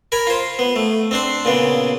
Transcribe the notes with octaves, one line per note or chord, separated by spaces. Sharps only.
A#4 G#5 B5
F4 C5
B3
A3
C4 D4 C5
A#2 C#3 B3